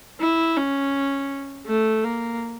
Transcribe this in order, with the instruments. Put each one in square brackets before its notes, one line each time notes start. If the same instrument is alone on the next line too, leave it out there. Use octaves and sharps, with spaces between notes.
[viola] E4
C#4
A3
A#3